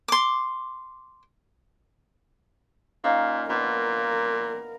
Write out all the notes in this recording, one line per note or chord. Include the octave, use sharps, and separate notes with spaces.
C6 D6
A#2 C#4 D#4 F5
A#2 B3 D4 A#4